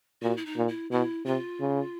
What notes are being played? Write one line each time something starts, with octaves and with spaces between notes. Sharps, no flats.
A#2 F#4
E4
D#4
A#2
E4
B2 E4
C3 F4
C#3